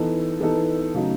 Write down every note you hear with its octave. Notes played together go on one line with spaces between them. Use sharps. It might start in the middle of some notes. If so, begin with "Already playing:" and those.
Already playing: E3 B3 D#4 A4
E3 B3 D#4 A4
C#3 F#3 A3 D#4